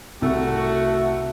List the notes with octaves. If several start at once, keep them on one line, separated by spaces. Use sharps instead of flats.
C2 A3 F#4